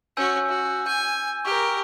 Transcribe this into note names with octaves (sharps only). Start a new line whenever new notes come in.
C#4 F#4 G#5 E6 G6
F#4
G#5 G6
G4 A#4 C#6 F6